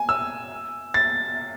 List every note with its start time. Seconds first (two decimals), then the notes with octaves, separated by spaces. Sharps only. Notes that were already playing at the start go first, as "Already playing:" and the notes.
Already playing: G#5
0.09 E6
0.94 A6